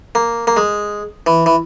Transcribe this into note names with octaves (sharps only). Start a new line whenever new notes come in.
A#3
A#3
G#3
E3
E3